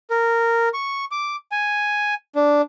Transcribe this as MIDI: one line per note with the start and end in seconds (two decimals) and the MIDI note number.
0.10 0.69 70
0.74 1.05 85
1.11 1.36 86
1.52 2.14 80
2.36 2.62 62